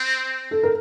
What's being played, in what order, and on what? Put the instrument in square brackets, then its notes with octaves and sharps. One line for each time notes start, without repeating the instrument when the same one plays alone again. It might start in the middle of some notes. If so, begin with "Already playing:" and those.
Already playing: [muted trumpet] C4
[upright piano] A4
A#4